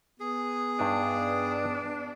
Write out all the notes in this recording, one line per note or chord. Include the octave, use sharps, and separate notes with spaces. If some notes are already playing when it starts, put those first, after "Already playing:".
B3 G#4
G2 D4 D#4 G#5